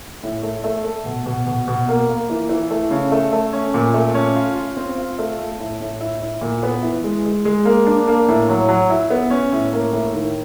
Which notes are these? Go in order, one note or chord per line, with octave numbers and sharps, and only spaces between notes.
A2
A3
A3
A3
B2
B2
B2
B2
A#3
A#3
E3
E3
A3
C#3
A3
A3
C#4
A#2
A3
C#4
F4
F4
C4
F4
A3
A3
A2
A2
E4
E4
A#2
B3
E3
G#3
G#3
G#3
A#3
D4
A#3
A2
F#3
F#3
E4
B3
C#4
A2
A#3
A2
D#3